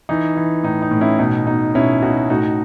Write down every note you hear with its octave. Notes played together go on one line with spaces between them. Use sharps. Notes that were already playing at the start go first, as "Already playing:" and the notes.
E3 D#4
E3
A2 D#4
D#4
A2
C#4 E4
B2 D#4
B2 D#4
B2 C#4 E4
B2 D#4 F#4
A2 D#4 F#4